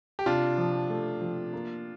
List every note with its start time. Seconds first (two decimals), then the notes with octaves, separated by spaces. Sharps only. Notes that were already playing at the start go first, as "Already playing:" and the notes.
0.19 G4
0.26 C3 D4 F4
0.58 F3
0.90 A3
1.21 F3
1.53 A#3